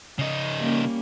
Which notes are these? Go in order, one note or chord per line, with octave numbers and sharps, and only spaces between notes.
C#3 D#4
G3 A#3 C#4